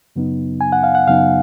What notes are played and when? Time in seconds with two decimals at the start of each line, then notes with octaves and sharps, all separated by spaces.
0.16 F#2 C#3 F#3 B3 D#4
0.61 G#5
0.72 F#5
0.83 F5
0.95 F#5
1.08 F#2 C#3 F#3 B3 D#4 F5